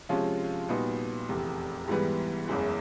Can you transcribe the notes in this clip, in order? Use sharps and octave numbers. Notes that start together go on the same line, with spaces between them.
C3 F3 G#3 C#4 F4
A#2 G3 B3 D#4 F#4
F1 E2 C3
G#2 E3 G3 B3
F#1 E2 C#3 E3 G#3